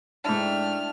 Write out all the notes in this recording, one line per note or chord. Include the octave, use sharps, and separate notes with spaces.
G#2 A3 D4 E4 G5 A5 F6